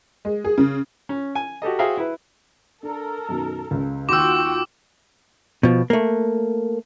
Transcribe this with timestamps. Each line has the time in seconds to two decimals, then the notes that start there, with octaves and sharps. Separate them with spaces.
0.25 G#3
0.44 G#4
0.58 C#3
1.09 C#4
1.35 G#5
1.62 F#4 G4 A4 D#5
1.79 F#4 G#4 C5 E5 F5 G5
1.97 E4 B4
2.83 D4 A4 A#4
3.29 F#2 B2 D#3
3.71 C#2 C#3
4.09 D#2 F4 F#4 G5 C6 D6 E6
5.63 B2 F3
5.90 A3 A#3